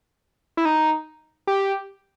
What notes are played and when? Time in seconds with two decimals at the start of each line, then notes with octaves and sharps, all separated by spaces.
0.57 E4
0.65 D#4
1.47 G4